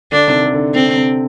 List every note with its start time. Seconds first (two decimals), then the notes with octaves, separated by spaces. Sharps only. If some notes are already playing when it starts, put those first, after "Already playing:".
0.12 D3 D4
0.27 C3 D#3
0.43 D3
0.53 D3
0.74 D3 C4
0.85 C3
0.96 C3